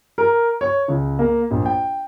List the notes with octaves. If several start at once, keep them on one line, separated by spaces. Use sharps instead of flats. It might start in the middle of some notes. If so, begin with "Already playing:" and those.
A#4
C#5
C#2
A#3
A#1
G5